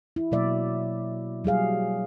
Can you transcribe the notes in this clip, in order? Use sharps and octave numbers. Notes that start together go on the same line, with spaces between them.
E4
B2 F#3 A#3 D5 E5
F#3 G3 G#4 F5